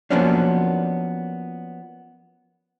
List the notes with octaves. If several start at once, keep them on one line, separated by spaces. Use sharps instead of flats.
F3 F#3 A#3 B3 C#4 D4